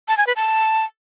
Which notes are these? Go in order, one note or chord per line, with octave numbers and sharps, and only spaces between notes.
A5
G#5
B4
A5